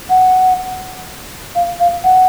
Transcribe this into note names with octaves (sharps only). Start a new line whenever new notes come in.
F#5
F5
F5
F#5